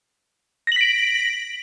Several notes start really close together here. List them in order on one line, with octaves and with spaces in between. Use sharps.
A#6 F#7 B6 D7